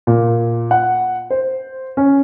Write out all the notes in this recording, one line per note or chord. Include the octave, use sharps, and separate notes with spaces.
A#2
F#5
C5
C#4